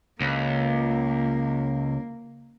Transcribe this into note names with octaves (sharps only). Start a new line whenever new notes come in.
C#2 A#3